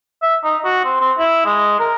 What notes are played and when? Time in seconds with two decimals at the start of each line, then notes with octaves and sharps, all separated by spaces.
0.22 E5
0.44 D#4
0.64 F#4
0.85 C4
1.01 C4
1.19 E4
1.45 G#3
1.79 A#4